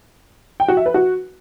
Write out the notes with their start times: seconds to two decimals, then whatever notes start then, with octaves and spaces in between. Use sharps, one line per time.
0.60 G5
0.68 F#4
0.77 E5
0.86 B4
0.94 F#4